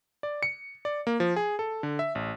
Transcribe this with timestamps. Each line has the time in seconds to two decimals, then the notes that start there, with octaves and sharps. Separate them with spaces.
0.23 D5
0.43 C#7
0.85 D5
1.07 A#3
1.20 F3
1.36 G#4
1.59 A4
1.83 D3
1.99 E5
2.15 A1